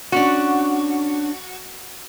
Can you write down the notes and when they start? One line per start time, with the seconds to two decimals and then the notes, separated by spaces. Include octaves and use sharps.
0.12 C#4 D4 F#4